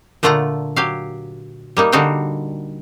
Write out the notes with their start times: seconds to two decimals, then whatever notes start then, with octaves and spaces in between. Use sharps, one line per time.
0.23 A#2 D3 A3 F4 F#5 A#5
0.76 F#3 G4 F5
1.77 G3 A#3 D#4
1.92 D3 G3 D#4 F#4 F5 G5